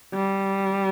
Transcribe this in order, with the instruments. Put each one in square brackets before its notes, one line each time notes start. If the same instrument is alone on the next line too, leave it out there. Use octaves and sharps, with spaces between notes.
[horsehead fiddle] G3